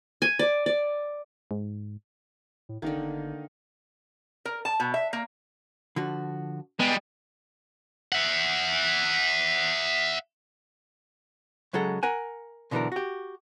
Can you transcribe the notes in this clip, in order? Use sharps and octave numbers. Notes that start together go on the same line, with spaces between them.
G#5
D5
D5
G#2
A2
G#1 D3 D#3 A#3 D#4
G1
A#4
A5
B2
E5
A#3
D3 F3 F#4
G3 G#3 B3
E5 F#5
C#3 F#3 G#3 A4 F#5
A#4 F#5 G#5
B2 D3 E3 F#3 D4 A#4
F#4 G4